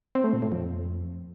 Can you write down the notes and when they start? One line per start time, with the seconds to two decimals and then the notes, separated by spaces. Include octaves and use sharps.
0.15 C4
0.24 A3
0.33 A#2
0.42 A2
0.52 F2